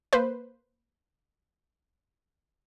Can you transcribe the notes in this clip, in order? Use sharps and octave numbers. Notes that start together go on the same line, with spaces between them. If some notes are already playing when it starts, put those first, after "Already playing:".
A#3 B4 C5